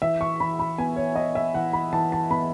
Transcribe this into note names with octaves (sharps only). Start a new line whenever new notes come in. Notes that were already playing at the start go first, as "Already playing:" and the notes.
E3 E5
C#6
E3 B5
B5
B3 G#5
C#5
B3 D#5
E5
E3 F#5
B5
E3 A5
A5
B3 B5